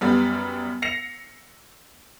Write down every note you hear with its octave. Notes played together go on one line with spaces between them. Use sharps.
F#2 G3 B3
A#6 C7 C#7 F7